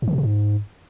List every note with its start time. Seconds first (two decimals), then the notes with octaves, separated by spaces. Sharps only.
0.02 G#2
0.08 D#3
0.13 B2
0.18 C3
0.23 G#2